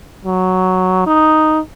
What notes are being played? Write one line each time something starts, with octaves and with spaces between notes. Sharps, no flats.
F#3
D#4